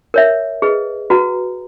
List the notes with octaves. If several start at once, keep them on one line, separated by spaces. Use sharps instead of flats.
A#4 C#5 E5
G#4 B4 D#5
F#4 B4 F#5 A#5